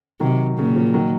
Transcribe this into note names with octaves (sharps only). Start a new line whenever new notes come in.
C3 D#3 F#3
A#2 C#3
C#3 F3
D#3 F#3